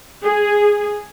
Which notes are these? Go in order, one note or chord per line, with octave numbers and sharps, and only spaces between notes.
G#4